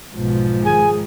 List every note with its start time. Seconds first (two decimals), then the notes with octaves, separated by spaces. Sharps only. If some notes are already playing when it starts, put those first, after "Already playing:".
0.15 B1 G#2 B2 F3
0.65 D#3 G#4 G#5